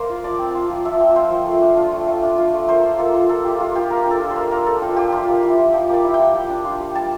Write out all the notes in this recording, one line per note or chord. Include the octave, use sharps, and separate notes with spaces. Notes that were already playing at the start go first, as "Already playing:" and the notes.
Already playing: A#3 A#4 C5
F4
F3 D5
C4
F4
F3
F3 E5
C4
F4 C5
F3
A3
D4
F4
A3
A3
D4
F4
A3
A#3 C5
F4
A#3 A4
F4
A#3 A4
F4 G4
A#3 F4
F4 G4
A#3 A#4
D4 A4
F4
C5
A#3
A#3 A#4
D4 A4
F4 G4
A#3 G4
F3 F4
A#3
E4 G4
F3
F3 G4
A#3 D5
E4
G5
F3
G3
D4
F4
G3
G3 A5